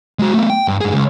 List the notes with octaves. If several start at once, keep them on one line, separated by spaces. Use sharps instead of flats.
G#3 F#4
A3 B3
G5
G2
G2 G#4
C#2